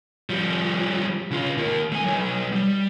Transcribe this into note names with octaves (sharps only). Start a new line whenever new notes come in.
F3 G3
C#3 F4
D#3 A#3
A3 G#5
F#3 D#4
G3